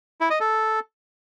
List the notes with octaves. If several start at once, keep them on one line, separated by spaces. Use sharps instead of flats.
E4
D#5
A4